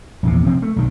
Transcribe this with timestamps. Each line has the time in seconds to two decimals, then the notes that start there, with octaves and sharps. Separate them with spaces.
0.23 A#1 E2 C3
0.46 C3 F3 C4
0.62 A3
0.76 B1 D#3